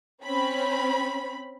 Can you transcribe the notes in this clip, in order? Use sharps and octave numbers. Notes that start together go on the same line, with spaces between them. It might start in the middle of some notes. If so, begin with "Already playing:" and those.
C4 C#4 B5